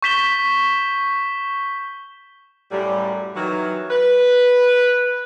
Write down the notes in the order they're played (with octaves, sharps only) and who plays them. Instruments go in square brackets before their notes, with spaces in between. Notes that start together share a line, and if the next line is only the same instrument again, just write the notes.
[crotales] C#6 G6 B6 E7 G7
[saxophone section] F#2 A2 G3
D#3 E3 F#3
B4